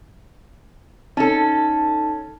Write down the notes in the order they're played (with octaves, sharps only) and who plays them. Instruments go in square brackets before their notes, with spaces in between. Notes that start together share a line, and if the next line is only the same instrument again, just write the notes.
[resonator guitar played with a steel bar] C#4 A4 [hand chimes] D#4 A5